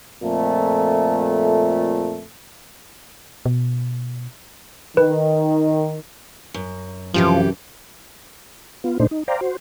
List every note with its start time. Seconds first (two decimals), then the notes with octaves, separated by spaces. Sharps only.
0.23 F2 A#2 A3
3.46 B2
4.97 D#3 B4
6.54 F#2
7.14 C2 F#2 E3 F3 G4 A4
8.84 B3 F4
9.00 A#2 A3 D4 D#4 C5
9.11 D#4
9.28 C5 D5 F5 G5 A#5
9.41 F#4 C5